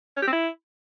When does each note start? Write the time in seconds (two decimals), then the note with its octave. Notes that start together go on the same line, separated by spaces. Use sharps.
0.17 C#4
0.22 G4
0.27 C4
0.32 E4